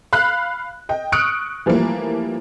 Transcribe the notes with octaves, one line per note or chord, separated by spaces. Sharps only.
F5 B5 F#6
D#5 G5
C#6 D#6 F6 F#6 C#7 D7
E3 F3 G3 A3 A#3